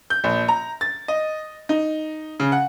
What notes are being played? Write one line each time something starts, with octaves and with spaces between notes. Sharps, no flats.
G6
A#1
A#5
A6
D#5
D#4
C#3
F#5